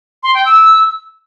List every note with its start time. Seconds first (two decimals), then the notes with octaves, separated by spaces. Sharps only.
0.23 C6
0.34 G5
0.45 E6